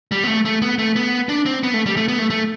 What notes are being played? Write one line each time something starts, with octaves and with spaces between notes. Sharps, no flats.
G3
B3
A3
A3
B3
A3
B3
D4
C4
B3
A3
G3
A3
B3
A3
A3